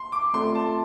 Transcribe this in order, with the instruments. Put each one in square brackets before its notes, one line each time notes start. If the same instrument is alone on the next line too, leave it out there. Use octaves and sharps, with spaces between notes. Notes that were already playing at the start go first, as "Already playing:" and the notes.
Already playing: [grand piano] C6
D6
[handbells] A3 C4 F4 A4 D5 [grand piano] C6
[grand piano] A5